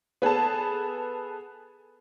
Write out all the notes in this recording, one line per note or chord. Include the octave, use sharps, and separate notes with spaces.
B3 G#4 A4 A5